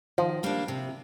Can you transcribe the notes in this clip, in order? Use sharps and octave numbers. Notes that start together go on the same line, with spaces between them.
D#3 F3
G3 A#3 D4
C3